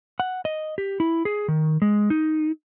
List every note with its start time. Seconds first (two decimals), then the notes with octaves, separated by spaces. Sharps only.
0.20 F#5
0.45 D#5
0.78 G4
1.00 E4
1.25 G#4
1.48 D#3
1.82 G#3
2.10 D#4